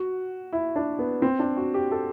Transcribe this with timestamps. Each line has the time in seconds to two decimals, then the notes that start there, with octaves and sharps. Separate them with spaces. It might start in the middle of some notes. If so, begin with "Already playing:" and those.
Already playing: F#4
0.53 E4
0.76 D4
0.99 B3
1.22 C4
1.39 D4
1.57 F#4
1.74 G4
1.92 A4